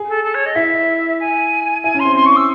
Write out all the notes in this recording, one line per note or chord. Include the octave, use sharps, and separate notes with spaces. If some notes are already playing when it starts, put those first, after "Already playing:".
Already playing: G#4
A4
A4
C#5
D#5
E4 E5
G#5
E4 G#5
C#4
C6
C4
C#4 C6
C#6
E6